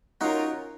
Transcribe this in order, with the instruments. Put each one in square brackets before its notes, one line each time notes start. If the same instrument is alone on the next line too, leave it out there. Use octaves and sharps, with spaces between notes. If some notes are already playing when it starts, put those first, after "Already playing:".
[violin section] C#4 F4 A#4 C#5 [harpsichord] D#4 F#4